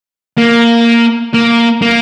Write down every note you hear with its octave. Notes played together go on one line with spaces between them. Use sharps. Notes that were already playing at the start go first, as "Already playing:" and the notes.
A#3
A#3
A#3